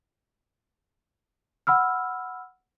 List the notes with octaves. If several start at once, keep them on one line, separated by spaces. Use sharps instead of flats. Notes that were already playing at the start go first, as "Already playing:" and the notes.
F#5 B5 E6 F6